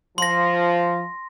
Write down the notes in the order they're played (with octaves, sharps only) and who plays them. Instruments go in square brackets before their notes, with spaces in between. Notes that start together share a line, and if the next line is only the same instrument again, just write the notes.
[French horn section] F3 [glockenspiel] C6 A#6